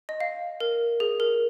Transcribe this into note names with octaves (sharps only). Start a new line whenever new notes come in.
D#5
F5
A#4
G#4
A#4